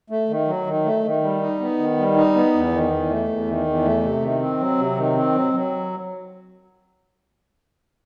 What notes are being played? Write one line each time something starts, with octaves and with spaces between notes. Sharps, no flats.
A3
D#3
F#3
D#3
A3
D#3
G3
D#4
B3
D#3
G3
D#4
B3
E2
D#3
E2
A3
E2
D#3
E2
A3
C3
D#3
C4
F#3
C3
D#3
C4
F#3
F#3